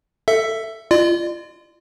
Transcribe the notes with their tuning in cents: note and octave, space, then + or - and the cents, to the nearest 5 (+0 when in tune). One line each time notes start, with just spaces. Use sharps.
A4 +15 E5 +5
F4 -25 D5 +40